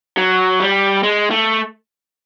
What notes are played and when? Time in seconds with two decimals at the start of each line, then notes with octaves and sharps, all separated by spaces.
0.17 F#3
0.60 G3
1.03 G#3
1.31 A3